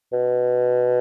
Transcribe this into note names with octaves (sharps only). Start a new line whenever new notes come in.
B2